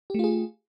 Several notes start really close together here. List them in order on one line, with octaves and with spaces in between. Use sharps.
G4 A3 F4 G#4